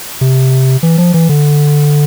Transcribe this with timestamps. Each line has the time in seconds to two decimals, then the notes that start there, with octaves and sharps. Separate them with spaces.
0.21 C3
0.83 E3
0.98 F3
1.14 E3
1.29 D3